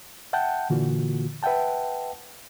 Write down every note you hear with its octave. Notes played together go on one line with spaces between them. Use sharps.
E5 F#5 G5 A5 G6
A#2 D3 E3 A#3 F4 F#4
B4 E5 F#5 G5 A5